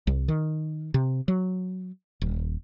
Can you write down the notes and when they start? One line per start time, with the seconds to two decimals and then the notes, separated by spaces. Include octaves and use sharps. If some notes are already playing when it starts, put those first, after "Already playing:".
0.07 C2
0.28 D#3
0.94 C3
1.28 F#3
2.21 D#1